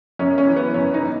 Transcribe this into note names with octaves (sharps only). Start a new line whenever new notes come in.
F#2 C#4
C#4
E3
B3
F#2 C#4
B3 D#4
E3